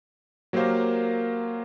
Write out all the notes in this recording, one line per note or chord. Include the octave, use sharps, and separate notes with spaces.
F#3 A#3 G4 A#4 C5 F5